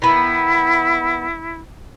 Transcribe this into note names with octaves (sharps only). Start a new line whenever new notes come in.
D#3 B3 E4